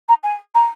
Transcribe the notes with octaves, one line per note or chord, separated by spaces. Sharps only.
A#5
G#5
A#5